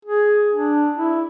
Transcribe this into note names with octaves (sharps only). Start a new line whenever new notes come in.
G#4
D4
E4